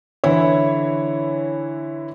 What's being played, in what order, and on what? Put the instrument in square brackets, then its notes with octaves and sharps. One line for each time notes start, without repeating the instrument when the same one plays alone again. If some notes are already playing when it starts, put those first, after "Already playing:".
[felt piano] D3 E3 E4 C#5